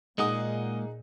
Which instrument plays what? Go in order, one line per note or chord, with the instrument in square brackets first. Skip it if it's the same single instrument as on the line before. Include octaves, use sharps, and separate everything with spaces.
[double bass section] A#2 [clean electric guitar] G#3 A#3 [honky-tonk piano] D#4 G#4 F#5 [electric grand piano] D#5 D#6